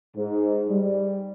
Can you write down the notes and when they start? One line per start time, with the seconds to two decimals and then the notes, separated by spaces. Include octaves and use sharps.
0.16 G#2
0.69 G3